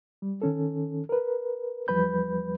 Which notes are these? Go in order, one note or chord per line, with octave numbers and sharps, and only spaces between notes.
G3
D#3 C#4 A4
A#4 B4
E2 F3 G3 B4 B5 G6